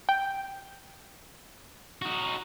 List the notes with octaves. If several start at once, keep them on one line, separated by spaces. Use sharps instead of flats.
G5
D#4 F#4